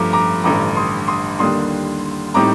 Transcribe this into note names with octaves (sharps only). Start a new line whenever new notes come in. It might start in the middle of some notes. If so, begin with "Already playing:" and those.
Already playing: G2 F3 A3 A#5 D6
A#5 D6
A1 G2 D3 A#5 D6
C6 D#6
C6 D#6
D#2 D3 G3 A#3 D4 C6 D#6
A2 G3 C4 D#4 A#5 D6